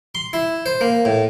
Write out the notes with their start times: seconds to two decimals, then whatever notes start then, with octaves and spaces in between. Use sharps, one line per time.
0.15 C6
0.33 E4
0.66 C5
0.81 A#3
1.05 A2